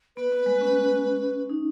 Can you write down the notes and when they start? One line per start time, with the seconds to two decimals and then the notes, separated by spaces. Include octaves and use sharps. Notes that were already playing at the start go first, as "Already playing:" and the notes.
0.17 B3 B4
0.32 B3
0.46 G#3
0.61 C#4
1.49 D#4